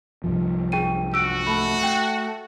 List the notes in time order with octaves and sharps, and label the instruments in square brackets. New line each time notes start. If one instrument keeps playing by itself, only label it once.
[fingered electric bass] C2 G2 F3
[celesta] G#4 G5 D#7
[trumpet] F#4 [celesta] E6 D7
[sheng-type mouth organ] A3 [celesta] B5
[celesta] G5